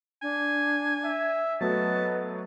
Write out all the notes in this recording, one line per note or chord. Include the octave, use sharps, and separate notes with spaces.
D4 G#5
E5
F#3 A3 B3 F#4 D#5 A5